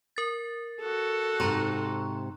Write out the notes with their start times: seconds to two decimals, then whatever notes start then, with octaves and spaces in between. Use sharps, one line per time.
0.16 A#4 A6
0.81 F#4 A4
1.40 G#2 C3 A#5 C6 C#6